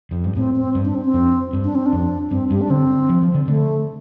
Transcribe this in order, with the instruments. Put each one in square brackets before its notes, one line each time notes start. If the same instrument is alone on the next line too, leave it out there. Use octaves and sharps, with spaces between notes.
[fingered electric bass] F2
G2
[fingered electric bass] A2 [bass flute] C4
[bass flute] C4
[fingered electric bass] G2
[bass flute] D4
C4
C4
[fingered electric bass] F2
G2
[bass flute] D4
C4
D4
[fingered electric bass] F2
[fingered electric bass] G2 [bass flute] C4
[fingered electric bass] G2 [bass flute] G3
[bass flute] D4
[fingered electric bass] D3 [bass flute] C4
[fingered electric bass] F3
F3
D3
[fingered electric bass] D3 [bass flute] A3